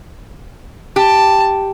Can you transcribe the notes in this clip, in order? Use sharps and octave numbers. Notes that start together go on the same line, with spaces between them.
G4 A5